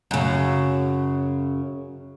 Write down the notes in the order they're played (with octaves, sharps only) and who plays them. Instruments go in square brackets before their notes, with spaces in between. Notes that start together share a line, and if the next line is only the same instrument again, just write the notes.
[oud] F#2 C#3